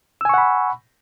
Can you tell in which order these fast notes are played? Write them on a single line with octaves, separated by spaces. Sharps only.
E6 G#5 C#6 F#5 B5